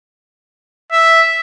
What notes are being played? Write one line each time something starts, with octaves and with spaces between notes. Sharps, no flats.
E5